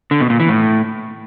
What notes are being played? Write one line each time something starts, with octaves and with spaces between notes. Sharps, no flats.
D3
B2
A#2
E3
A2